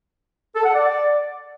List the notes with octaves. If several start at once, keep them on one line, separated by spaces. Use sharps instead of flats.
A4
F#5
D5